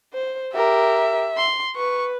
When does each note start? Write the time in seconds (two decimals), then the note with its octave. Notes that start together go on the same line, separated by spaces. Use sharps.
0.13 C5
0.54 G4 A#4 E5
1.37 C6
1.76 B4 C#6